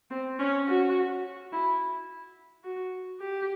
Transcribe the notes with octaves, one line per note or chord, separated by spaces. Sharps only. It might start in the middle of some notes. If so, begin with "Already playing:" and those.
C4
C#4
F#4
E4
F#4
G4